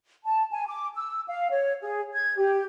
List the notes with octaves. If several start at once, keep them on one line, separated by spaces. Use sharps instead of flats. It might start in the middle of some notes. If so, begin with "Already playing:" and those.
A5
G#5
D6
E6
F5
C#5
G#4
G#6
G4